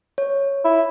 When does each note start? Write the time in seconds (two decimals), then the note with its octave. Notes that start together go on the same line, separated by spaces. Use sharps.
0.18 C#5
0.65 E4